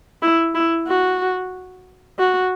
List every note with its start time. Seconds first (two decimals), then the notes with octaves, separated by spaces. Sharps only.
0.22 E4
0.55 E4
0.88 F#4
2.19 F#4